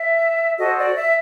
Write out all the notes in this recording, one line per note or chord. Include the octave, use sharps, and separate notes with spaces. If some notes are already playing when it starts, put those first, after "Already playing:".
Already playing: E5
F#4 A4 C5 D#5
D5
E5